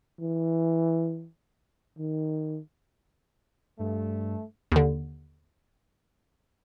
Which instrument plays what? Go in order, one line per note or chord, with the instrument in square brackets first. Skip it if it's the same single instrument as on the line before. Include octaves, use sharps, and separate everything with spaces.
[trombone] E3
D#3
[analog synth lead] G2 [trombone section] A3
[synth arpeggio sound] D#2 D3